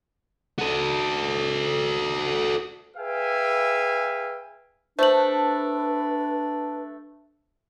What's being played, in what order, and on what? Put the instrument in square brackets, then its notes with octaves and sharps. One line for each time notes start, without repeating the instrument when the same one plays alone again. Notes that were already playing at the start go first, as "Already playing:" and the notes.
[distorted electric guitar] F#4 A4
[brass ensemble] G#4 B4 E5 F5 G5 G#5
[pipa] A3 [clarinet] D4 [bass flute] B4 [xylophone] C5 F#7